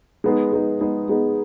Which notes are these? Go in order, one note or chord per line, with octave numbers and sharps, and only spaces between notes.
G#3 B3 D#4 G#4
G#3 B3 D#4 G#4
G#3 B3 D#4 G#4
G#3 B3 D#4 G#4